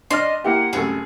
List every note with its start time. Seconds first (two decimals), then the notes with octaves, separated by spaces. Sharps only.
0.11 D4 D5 D#5 C6 F6
0.44 A#3 E4 G4 F#5
0.73 C2 F#2 A3 G#4